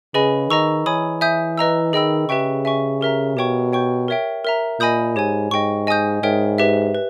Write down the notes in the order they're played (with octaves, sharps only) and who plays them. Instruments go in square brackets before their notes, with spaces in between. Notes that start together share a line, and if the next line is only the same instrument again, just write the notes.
[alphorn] C#3 [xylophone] G#4 B4 D#5 G#5 B5
[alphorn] D#3 [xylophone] D#5 A#5 C#6 E6
[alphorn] E3 [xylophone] C#5 G#5 B5 D#6
[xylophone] E5 G#5 D#6 G6
B4 D#5 A#5 E6
[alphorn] D#3 [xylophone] G#4 D#5 G5 B5 E6
[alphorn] C#3 [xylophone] G4 B4 E5 G5 C#6
[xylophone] E5 G#5 C#6
G4 A#4 E5 A#5
[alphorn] B2 [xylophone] G4 C#5 G5 C#6
[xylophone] C#5 G5 C#6 G6
A#4 C#5 E5 G5
A#4 E5 A#5
[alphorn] A#2 [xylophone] D#5 G#5 B5 D#6 G6
[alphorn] G#2 [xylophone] G4 C#5 G#5
[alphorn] G#2 [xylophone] D#5 G5 C#6
[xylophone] D#5 G#5 D#6 G6
[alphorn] G#2 [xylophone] A#4 C#5 E5 G5
[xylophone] G4 B4 E5
B4